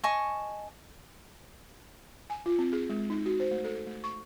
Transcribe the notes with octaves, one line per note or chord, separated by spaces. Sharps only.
D#5 G#5 A5 C#6
G#5
F4
C4
G#4
G#3
D#4
F#4
C5
A3
A4
A3
C#6